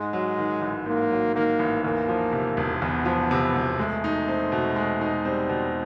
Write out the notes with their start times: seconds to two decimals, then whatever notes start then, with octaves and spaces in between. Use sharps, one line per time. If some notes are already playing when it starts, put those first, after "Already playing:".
Already playing: G#2 G#3
0.13 F#3
0.38 D#3
0.62 A1
0.86 G#2 A#3
1.11 F#3
1.36 D#3 A#3
1.59 A1
1.84 E2 A#3
2.08 F3
2.33 C3
2.57 E1
2.81 E2 B3
3.05 F3
3.31 C3
3.55 E1
3.79 G#3 A3
4.04 D#4
4.28 C4
4.52 B2
4.76 G#3
5.01 D#4
5.25 G3 C4
5.49 B2